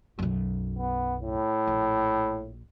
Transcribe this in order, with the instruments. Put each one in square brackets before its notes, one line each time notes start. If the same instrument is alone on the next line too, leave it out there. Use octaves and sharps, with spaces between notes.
[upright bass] B1 F#2
[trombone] B3
A2
[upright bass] A#1